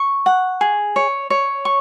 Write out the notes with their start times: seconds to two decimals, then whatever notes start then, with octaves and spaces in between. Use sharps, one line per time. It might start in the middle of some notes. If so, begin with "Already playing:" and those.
Already playing: C#6
0.26 F#5
0.61 G#4
0.96 C#5
1.30 C#5
1.65 C#6